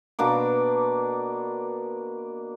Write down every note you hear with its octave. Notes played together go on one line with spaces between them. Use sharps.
B2 A#3 D4 D6